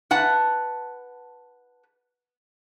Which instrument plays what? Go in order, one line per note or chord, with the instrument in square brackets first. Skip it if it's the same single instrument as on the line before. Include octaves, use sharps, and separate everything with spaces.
[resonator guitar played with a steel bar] B4 F#5 A5